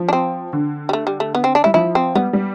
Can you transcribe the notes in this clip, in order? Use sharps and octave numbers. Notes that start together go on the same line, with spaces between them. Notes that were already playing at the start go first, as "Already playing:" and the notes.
Already playing: F3
D4
C4
D3
G3
A3
G3
A3
B3
C4
D4
G3 E4
F3 E4
C4
G3 B3
G3